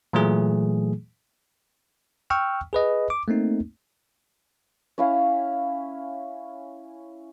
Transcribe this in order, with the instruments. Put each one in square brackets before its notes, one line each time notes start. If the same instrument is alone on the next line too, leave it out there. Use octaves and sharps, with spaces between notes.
[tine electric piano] A#2 E3 F#3 A3 G#4
G5 C#6 E6 F6
G#4 B4 D#5
D6
A3 A#3 C4 D#4
[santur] C#4 E4 F5